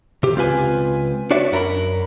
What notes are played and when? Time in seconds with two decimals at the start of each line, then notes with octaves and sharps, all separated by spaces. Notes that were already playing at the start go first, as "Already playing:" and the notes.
0.23 C3 G4
0.36 C#2 C4 F4 B4 G#5
1.31 D4 F#4 C#5 D5 E5
1.52 F#2 A#4 A#5 B5